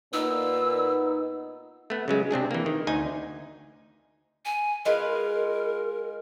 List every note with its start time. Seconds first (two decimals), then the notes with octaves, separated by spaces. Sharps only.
0.13 A#2 B3 D#4 E6
1.90 A3 B3
2.08 C#3 F#3 G#3
2.31 C3 C4 D4 G#4
2.51 E3 A#3
2.66 D#3
2.87 D2 D#4 G#5
4.45 G#5
4.85 G#3 F4 A#4 B4